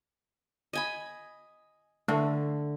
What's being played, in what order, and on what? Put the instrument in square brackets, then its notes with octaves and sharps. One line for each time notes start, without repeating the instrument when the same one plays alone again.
[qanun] D#5 G#5 B5
[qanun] D3 [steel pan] A3